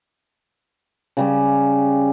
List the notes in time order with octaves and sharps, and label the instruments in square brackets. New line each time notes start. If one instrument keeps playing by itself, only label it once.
[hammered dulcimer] C#3 G3 C#4